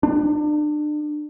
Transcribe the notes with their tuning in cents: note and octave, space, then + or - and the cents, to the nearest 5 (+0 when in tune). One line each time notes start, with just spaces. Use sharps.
D4 +35